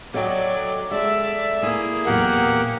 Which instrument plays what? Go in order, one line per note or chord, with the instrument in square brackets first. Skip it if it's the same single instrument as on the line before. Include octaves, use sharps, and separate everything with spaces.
[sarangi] F#3 [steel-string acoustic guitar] A4 D#5 G5 [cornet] D5
[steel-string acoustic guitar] G#3 A4 [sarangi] D5 [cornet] E5
[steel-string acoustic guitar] A3 E4 [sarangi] A#3 [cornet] G#4
[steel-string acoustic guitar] E2 A#2 F#3 [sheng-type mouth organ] G4 A#4 F#5